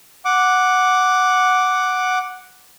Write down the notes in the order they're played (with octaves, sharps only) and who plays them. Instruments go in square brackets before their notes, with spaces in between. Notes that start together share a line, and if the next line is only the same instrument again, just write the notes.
[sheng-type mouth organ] F#5 D6